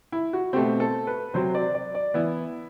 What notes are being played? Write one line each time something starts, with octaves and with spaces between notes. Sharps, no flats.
E4
F#4
B2 A3 C4 G4
A4
B4
C3 F#3 C4 C5
D5
D5
D5
E3 B3 E4